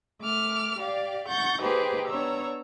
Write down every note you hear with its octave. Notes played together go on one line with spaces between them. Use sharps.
A3 D6 F6
G4 D5 F5
F#5 C#6 G6 A6 A#6
A#3 D#4 G4 G#4 B4 C5
B3 D4 C#5 A#5 E6